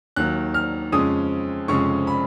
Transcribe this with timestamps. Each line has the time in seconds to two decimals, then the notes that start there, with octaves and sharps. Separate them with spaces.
0.16 D#2 D#3 F#3 F#6
0.54 F6
0.92 F2 C#3 G#3 C#4 D#6
1.68 F1 F2 C#3 G#3 C#4 C#6
2.07 B5